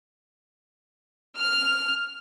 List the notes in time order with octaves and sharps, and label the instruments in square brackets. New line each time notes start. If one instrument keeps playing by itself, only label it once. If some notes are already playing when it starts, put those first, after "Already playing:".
[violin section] F6